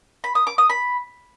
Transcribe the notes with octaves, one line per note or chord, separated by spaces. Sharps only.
B5
D#6
D6
D#6
B5